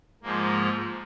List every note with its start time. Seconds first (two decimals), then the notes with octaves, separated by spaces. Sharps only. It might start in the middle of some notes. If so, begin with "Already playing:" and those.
0.23 G#2 F3 G#3 A#3